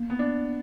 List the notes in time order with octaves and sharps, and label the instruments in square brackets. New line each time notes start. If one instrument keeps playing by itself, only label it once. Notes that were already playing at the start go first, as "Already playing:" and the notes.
Already playing: [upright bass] A#3
[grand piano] B3
D4